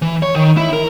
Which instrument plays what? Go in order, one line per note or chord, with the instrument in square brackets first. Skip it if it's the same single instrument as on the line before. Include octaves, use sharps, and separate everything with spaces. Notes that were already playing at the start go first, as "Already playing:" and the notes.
[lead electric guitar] E3
C#5
D#3
E4
A#4